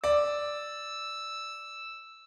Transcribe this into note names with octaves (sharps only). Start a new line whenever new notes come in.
D5 E6